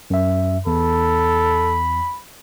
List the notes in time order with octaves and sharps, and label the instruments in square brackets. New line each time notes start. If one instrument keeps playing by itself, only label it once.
[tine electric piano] F#2 E5
[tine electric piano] E2 [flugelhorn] A4 [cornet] B5